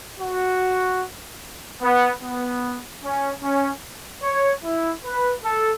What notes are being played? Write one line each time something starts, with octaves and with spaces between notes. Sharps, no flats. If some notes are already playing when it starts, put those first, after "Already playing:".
F#4
B3
B3
C#4
C#4
C#5
E4
B4
A4